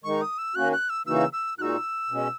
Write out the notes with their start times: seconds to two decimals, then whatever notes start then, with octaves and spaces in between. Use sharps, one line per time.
0.04 D#3 G#3 D#4 C#6
0.21 D#6
0.38 E6
0.55 D#3 A#3 C#4 F#4 F#6
0.73 F#6
0.90 E6
1.07 C#3 E3 A#3 D#4 F#4 E6
1.33 E6
1.58 A#2 G#3 D#4 F#4 E6 F#6
2.10 B2 G#3 C#4